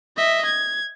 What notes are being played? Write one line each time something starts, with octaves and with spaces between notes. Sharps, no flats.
D#5 E5
G#6